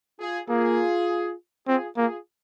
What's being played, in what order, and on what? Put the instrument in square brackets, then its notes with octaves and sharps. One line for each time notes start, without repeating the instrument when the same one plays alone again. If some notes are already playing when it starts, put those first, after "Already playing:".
[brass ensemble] F4 G#4
[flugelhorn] A#3 [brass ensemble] F4 G#4
[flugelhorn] C4 [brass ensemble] F4 G#4
[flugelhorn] A#3 [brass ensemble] F4 G#4